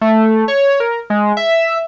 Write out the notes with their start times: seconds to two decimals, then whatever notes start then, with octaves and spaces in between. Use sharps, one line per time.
0.01 A3
0.48 C#5
0.80 A#4
1.10 G#3
1.37 E5